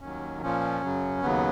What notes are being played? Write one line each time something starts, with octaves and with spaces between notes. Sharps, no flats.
D#2 D#3 F#3 C#4
A#2 F3 C#4
F#2 C#3 F#3
D#2 C#3 F#3 B3